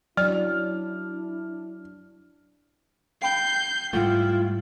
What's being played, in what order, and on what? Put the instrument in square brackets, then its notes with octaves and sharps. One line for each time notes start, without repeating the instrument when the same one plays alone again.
[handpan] F#3 [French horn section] D4 E4 [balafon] D5 [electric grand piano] F6
[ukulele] F5 G5 B5 [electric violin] G6 C7
[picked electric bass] G#2 G3 A3 [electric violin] E4 [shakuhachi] F4 [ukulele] E5 F#5 G5